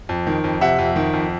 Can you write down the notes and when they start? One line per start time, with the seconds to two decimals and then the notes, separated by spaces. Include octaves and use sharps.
0.09 F2
0.27 D#3
0.44 F2
0.61 C3 E5 F#5
0.79 F2
0.96 D#3
1.13 F2